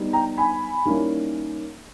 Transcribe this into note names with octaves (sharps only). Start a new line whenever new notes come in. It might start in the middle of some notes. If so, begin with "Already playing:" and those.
Already playing: G3 B3 D#4
G5 A#5
G#5 B5
D#3 G3 A#3 C#4 E4